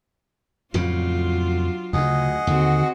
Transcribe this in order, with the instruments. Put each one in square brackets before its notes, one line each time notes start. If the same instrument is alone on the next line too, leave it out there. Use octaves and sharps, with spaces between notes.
[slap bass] F2 A2 C#3 [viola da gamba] F#3 D4 F4
[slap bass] D2 [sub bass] C#3 [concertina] G#4 D#5 F#5
[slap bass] D#2 [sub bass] D3 [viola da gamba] C4 F#4